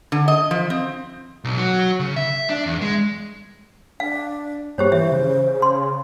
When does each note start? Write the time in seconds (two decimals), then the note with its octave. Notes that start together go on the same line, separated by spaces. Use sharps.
0.12 D3
0.28 D#5
0.51 F3
0.70 C4
1.44 B1
1.57 F#3
2.00 C#3
2.16 E5
2.50 D4
2.66 E2
2.81 G#3
4.00 D4 F5
4.78 G2 A#3 G4 C5 C#5
4.92 E3 C5 E5
5.12 C#3
5.62 C6